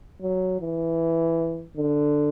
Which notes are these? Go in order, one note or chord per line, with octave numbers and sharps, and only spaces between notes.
F#3
E3
D3